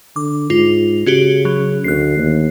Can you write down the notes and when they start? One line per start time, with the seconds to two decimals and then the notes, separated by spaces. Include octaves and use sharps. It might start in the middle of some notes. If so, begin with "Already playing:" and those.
0.16 D3 D6
0.50 G#2 F4
1.06 C#3 C#4 F#4 G4
1.45 F#3
1.84 D2 F#6 C7
2.18 D#2